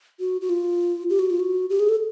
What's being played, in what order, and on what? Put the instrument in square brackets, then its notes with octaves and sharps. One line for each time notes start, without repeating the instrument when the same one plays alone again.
[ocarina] F#4
F#4
F4
G4
F#4
F4
F#4
G4
G#4
A4